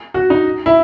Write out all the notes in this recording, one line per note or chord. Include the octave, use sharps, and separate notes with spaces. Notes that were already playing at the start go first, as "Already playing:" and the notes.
F#4
D#4
E4